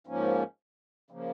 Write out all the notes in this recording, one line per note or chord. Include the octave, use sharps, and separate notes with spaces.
G#2 F3 A#3 C#4
C#3 F3 A#3